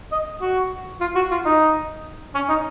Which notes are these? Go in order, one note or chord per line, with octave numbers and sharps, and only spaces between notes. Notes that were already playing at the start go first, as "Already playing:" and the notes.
D#5
F#4
F4
F#4
F4
D#4
C#4
D#4